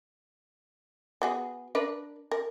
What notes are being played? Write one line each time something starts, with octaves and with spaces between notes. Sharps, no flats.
B3 F#4 G#4
D4 A#4 B4
A#4